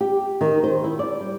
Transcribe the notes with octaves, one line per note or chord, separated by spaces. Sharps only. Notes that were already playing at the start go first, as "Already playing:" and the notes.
G4
D#3
C5
E4
D5
G3